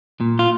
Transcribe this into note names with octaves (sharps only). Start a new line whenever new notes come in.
A#2
F4